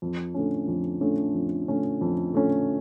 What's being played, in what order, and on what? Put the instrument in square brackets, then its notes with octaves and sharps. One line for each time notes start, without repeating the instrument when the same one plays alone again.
[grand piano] F2
D3 A3 C#4
F2
D3 A3 C#4
F2
D3 A3 C#4
F2
D3 A3 C#4